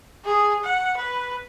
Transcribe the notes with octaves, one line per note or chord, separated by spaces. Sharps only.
G#4
F#5
B4